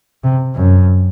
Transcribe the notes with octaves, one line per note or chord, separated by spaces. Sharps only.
C3
F#2